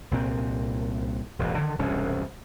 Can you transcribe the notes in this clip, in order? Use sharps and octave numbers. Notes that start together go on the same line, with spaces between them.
C2 A#2 C4
E1 A1 G2
D3 D#3
E1 C2 G2 C#4